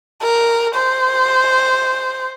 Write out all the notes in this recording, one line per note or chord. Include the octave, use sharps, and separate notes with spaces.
A#4
C5